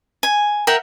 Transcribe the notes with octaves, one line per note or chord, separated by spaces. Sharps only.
G#5
A#4 E5 F#5 G5